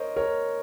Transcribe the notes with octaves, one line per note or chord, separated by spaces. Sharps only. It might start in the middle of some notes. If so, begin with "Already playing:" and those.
Already playing: A#4 C5 C#5 D#5
A#4 C#5